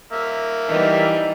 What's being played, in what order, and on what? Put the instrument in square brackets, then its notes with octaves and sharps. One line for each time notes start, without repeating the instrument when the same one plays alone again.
[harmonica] A#3 E5
[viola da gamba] E3 G3 [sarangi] D#4